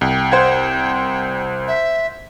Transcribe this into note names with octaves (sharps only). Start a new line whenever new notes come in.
C2 G5
C5 F#5 G#6
E5